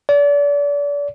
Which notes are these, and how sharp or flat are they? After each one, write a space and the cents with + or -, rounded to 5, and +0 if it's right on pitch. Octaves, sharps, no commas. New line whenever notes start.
D5 -35